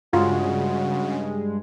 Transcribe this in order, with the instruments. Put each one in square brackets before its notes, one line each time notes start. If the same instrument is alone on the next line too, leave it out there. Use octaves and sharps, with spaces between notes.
[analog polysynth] G2 G#3 [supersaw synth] C#3 [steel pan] F4 [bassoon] F#4